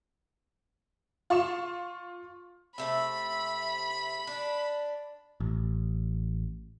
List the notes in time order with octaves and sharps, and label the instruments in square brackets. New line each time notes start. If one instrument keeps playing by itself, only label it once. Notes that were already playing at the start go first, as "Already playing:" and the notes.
[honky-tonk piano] F4 C6 C#6 E7
[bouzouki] C3 A3 E5 [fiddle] B5
[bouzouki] D4
[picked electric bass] A1